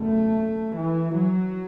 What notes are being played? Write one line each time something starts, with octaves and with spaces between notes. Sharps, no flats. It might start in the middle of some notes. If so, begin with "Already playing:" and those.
Already playing: F#1 E2 B2 A3
E3
F#3